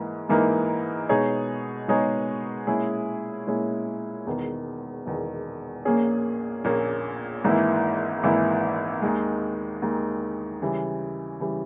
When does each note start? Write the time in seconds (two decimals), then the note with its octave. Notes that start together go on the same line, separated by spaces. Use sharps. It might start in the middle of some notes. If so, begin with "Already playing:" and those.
Already playing: G#2 E3 A#3
0.29 G#2 E3 A#3 D#4 A#4
1.09 B2 G#3 D#4 G#4 C#5
1.88 B2 G#3 D#4 G#4 C#5
2.67 A#2 G#3 C#4 E4 G#4
3.47 A#2 G#3 C#4 E4 G#4
4.26 E1 E2 D#3
5.06 E1 E2 D#3
5.85 A#1 A#2 A#3 C#4 G#4
6.64 A#1 A#2 A#3 C#4 G#4
7.44 G#1 G#2 E3 A#3 E4
8.23 G#1 G#2 E3 A#3 E4
9.02 D#2 D#3 G#3
9.82 D#2 D#3 G#3
10.62 C#3 E3 G3
11.40 C#3 E3 G3